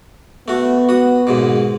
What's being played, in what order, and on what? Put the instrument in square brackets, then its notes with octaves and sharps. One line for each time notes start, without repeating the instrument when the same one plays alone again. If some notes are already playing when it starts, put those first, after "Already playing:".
[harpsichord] A3 F#4 [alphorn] B3
[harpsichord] F#4 D#6
D#2 G#2 B2